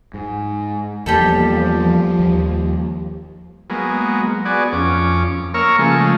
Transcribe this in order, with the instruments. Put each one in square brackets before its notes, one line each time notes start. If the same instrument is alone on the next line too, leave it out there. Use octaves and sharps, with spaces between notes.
[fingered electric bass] G#2
[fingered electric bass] E2 A#3 [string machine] F3 [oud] G3 G4 A4
[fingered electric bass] D#2
[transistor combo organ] F#3 G#3 A#3 B3
B3 F#4 G#4 D5
F2 C#4 D6
A#3 A#4 C#5 C#6 E6 F6
C#3 F3 G#3 A3